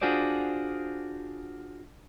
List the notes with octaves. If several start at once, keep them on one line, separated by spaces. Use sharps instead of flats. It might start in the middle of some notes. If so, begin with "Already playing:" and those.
D4 F4 F#4 G#4 C5 D5